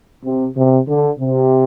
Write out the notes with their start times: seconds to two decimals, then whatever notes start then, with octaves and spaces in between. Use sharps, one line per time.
0.24 C3
0.56 C3
0.88 D3
1.19 C3